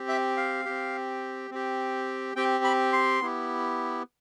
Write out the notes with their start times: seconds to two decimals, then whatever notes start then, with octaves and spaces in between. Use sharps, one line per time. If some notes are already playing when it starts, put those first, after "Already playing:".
Already playing: C4 G4
0.09 E5
0.37 F5
0.65 C4 G4
1.51 C4 G4
2.36 C4 G4 G5
2.64 B5
2.93 C6
3.21 B3 E4 G4